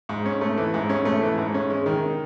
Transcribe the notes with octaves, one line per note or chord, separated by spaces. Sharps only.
G#2
C#4
A3
E3
G#2
C#4
A3
E3
G#2
C#4
G#3
D#3